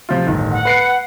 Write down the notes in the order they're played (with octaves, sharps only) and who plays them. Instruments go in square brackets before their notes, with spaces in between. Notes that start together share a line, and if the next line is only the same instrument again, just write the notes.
[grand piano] C3 F3 F4
D1 G1 D#3
[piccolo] F#5
[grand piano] B4 C7 C#7